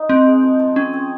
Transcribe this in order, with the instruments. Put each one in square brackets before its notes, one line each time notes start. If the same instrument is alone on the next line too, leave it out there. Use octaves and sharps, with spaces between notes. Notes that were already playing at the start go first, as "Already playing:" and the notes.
Already playing: [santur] D#4
[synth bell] C4 [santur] C5
[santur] G#3
F3
F3
[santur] C4 [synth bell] C#4
[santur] C4